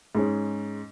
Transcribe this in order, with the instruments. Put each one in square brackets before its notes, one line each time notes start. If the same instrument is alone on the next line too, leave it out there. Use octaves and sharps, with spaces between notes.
[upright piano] G#2 G#3 C#4